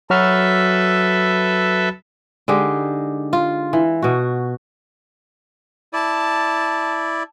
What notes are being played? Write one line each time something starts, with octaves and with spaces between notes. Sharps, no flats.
F#3 F#4 A4 B4 E5 F6
D3 G#3 D#4 G4
F4
E3
B2 F#4
E4 D5 A5